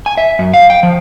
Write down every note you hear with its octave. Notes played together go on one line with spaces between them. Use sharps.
G#5
E5
F#2
F5
G5
F3